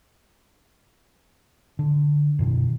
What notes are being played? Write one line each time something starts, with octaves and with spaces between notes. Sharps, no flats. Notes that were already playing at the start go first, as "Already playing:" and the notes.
D3
F#2 B2 D#3